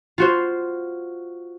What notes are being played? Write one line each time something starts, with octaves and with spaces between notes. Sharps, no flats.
F4 F#4 C5